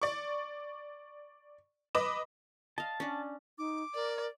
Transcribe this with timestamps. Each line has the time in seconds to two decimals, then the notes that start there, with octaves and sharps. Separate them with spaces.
0.02 D5 C#6
1.95 B4 D#5 B5 D6 E7
2.78 D#5 F5 A5
3.00 C#4 D4
3.58 D#4 D6
3.95 A#4 D5